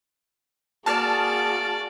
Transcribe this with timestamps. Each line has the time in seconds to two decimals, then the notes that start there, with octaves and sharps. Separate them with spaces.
0.86 A#3 F#4 G#4 D5 A5 F6